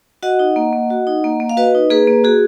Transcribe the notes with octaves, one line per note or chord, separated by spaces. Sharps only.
F#4 D#5 F#5
D#4
A#3
A#3
F#4
D#4
A#3
A#3
F5
F#4 B4 D#5
D#4
A#3 G#4 B4
A#3
F#4 G#4